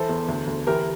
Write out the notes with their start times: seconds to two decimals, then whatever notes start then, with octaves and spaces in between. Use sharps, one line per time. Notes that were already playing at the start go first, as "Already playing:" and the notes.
Already playing: E3 A4 C5
0.09 E2
0.28 D2
0.47 D2
0.67 E3 G4 A#4